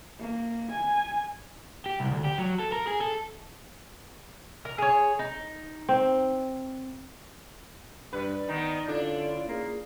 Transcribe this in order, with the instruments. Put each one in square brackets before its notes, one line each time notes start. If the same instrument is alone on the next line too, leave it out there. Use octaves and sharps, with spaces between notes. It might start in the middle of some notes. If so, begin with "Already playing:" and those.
[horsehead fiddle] A#3
G#5
[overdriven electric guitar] G4
C2
D2
G4
F#3
A4
A#4
G#4
A4
[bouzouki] A#4
G#4 C#5
D#4
[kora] C4
[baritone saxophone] G2 [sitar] B4 [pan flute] D5
[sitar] D#3 B3 [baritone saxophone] D#4
[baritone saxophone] D3 [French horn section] C#4 E4 F4 [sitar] D4
[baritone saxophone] A#3 [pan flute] G#4